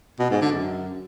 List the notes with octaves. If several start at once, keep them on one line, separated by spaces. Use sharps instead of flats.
B2
G#2
D3
F#2